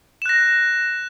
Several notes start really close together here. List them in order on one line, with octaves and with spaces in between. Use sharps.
E7 F#6 A#6